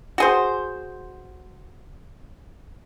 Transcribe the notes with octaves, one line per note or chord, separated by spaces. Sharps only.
F#4 G#4 C5